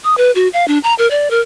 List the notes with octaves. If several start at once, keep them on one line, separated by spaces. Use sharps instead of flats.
D#6
B4
F#4
F5
D4
A#5
A#4
D5
A#4